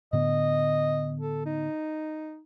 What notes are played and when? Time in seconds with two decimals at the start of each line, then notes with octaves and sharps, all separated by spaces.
0.13 A2 D3 B3 D#5
1.20 A4
1.46 D#4